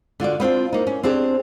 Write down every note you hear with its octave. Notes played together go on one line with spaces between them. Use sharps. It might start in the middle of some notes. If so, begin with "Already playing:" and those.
D3 F4 F#4 D5
B3 C4 D4 F4
A#3 D#4
C#4
C4 D4 G4 G#4 C5